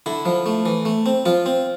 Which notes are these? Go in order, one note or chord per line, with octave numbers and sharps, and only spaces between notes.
D3 E4
F3
A3
E3
A3
C4
F3 F4
C4